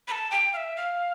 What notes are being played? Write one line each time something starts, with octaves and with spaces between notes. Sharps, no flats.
B5
A5
G5
F5
E5
F5